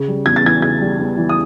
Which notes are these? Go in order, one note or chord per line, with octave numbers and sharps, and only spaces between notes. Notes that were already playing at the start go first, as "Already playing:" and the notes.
Already playing: C#3
G3
E2 G#6
A6
E3 G#6
C#3 G#6
G3
E2
E3
D#6